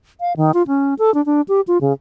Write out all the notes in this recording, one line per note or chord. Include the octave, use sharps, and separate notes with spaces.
F5
D#3
F4
C#4
A4
D4
D4
G4
F4
C#3